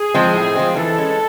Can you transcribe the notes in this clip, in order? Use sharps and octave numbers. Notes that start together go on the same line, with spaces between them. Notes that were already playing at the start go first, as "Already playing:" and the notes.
Already playing: G#4
F3 G#3 C4
A2
F3 G#3 C4
E3 A4
G#3 C#4